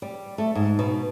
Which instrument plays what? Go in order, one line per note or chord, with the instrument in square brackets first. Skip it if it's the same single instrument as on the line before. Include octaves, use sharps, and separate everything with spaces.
[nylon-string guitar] G3
A3
G#2
B2